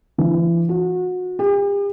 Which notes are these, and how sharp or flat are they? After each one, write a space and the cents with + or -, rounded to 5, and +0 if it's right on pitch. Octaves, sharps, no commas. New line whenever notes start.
E3 +40
F#4 -25
G4 +45